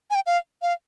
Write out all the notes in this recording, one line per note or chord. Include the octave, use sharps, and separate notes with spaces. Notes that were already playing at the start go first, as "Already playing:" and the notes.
G#5
G5
F5
F5